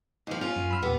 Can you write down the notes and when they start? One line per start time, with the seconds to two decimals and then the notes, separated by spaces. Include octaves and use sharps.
0.27 D#2 F3
0.41 C#4 F4
0.56 F#2
0.71 B5 E6 F6
0.82 E2 A#2 B3 G4